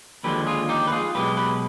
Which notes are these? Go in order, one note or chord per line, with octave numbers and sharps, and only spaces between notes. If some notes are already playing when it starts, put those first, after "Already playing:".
D#2 D3 F3 G#3 G4 B4
F4 G#4
D#4 G4
B4
F4 G#4
B1 B2 G#3 G4 B4
G4 B4